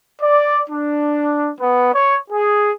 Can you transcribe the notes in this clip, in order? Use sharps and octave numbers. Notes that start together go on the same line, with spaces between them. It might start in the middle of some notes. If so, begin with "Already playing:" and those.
D5
D4
B3
C#5
G#4